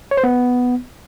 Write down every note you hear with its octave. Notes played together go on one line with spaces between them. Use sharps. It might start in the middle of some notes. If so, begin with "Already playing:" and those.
C#5
C5
B3